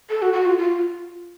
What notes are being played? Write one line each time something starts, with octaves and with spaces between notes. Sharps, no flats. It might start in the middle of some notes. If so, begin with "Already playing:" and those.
A4
F#4
F#4
F4
F4